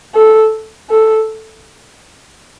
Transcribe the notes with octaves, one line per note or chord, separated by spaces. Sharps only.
A4
A4